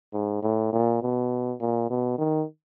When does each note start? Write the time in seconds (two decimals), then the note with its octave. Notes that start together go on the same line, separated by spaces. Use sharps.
0.13 G#2
0.43 A2
0.73 A#2
1.02 B2
1.60 A#2
1.90 B2
2.18 D#3